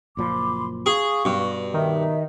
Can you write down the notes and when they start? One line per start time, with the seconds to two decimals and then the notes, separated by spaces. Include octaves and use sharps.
0.17 F#1 A#2 F3 B5 C6 D6
0.86 G#4 F5 C#6
1.25 G2 B2
1.74 D#3 E5